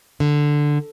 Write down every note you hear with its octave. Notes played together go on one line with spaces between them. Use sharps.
D3